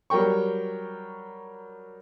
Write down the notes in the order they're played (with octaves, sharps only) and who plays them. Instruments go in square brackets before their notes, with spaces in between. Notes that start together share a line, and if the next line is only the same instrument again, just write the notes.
[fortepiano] F#3 G3 A#4 G5 C#6